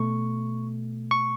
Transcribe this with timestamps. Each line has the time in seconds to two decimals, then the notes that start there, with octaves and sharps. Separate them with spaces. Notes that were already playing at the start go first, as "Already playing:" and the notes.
Already playing: B2 A3 C#6
1.11 C#6